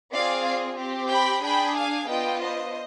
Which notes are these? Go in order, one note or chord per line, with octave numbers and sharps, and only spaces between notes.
C4 F4 G#4 D5 F5
C4 G4
G5 B5
D4 G#4 G5 B5
F5 G#5
B3 D4 F4 D#5 G5
C5 D#5